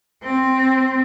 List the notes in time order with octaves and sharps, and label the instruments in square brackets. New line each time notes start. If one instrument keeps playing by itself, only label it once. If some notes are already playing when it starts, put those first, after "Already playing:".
[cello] C4